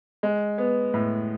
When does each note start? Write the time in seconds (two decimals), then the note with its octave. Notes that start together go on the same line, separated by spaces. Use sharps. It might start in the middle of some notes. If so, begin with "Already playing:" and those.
0.23 G#3
0.58 B3
0.94 A2